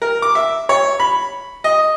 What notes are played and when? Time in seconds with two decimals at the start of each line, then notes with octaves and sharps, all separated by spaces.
0.02 A#4
0.22 D6
0.35 E5
0.69 C#5
1.00 B5
1.64 D#5